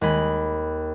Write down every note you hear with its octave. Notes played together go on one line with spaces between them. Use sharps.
D#2 G#3 B5